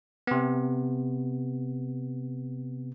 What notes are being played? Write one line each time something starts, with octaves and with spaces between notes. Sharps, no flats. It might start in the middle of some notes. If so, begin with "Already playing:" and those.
C3 B3